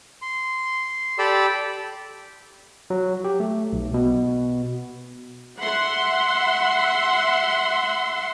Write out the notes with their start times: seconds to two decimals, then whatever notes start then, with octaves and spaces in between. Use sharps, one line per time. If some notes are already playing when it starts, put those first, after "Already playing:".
0.22 C6
1.19 G4 A4 D5 B5 D6 E6
2.90 F#3
3.24 G4
3.40 A3
3.73 B1
3.94 B2
5.61 E5 F#5 C6